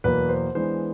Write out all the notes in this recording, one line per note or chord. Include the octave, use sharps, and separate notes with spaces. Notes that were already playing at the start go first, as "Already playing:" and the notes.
E2 B2 F#3 A#3 B4
C5
E3 G#3 B3 D4 C5